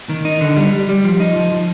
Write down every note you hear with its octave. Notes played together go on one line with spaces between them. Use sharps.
D#3
D#4
D3
G3
G3
G3
F3
D#4
F3
F3